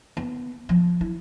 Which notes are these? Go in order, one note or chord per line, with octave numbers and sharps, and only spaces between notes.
B3
F3
E4